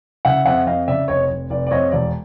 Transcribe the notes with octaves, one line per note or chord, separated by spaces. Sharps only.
C#3 E5 F#5
F2 E5 F#5
F2 D#5 F5
C#3 D5 E5
F1 C#5 D#5
F1
F1 D5
D5
F2 C#5 D#5
E1 D5